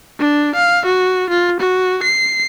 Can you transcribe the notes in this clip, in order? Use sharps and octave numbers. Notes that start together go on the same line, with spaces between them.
D4
F5
F#4
F4
F#4
C7